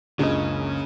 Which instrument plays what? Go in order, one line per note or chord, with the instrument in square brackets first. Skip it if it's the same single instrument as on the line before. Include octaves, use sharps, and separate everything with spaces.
[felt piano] F#1 C#2 [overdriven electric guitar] C#3 [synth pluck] D4 D#5